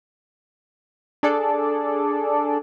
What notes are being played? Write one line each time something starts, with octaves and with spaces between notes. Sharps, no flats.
D4 G#4 A4 D5